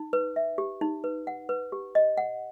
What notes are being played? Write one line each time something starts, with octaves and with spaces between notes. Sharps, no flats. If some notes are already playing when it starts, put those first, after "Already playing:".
Already playing: D#4
B4
E5
G4
D#4
B4
F#5
B4
G4
D#5
F#5